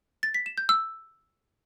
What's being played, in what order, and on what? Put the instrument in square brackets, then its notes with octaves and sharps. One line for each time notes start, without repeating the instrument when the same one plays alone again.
[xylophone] A6
B6
E7
G6
E6